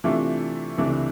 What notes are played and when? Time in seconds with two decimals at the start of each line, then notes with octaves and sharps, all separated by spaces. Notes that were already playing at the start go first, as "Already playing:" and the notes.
0.04 C3 E3 A3 D4 F4
0.78 C#2 C3 E3 A3 D4